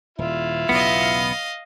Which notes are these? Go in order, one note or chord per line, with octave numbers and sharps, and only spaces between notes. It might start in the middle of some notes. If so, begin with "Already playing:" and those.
D#1 E4 F4 E5
B1 E2 C#3 B3 D#5 F5